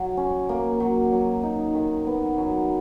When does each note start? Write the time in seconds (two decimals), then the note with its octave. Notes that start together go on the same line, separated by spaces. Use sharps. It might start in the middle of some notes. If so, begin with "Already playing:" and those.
Already playing: F#3
0.17 C#4
0.49 A#3
0.80 F#3
1.12 F#3
1.43 D#4
1.75 D#3
2.07 B3
2.38 F#3